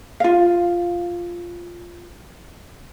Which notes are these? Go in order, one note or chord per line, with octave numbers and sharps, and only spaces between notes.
F4 F5